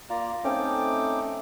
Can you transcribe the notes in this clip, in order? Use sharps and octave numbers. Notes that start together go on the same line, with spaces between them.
A#3 F4 D5 A#5
A3 C4 C#4 D#4 G5 D6